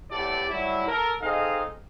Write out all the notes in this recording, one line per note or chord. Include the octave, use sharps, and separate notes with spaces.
E2 A2 E4 G4 A4 D5
F#3 G3 A3 E4
A4 A#4
C4 D#4 G#4 A4 D#5 F5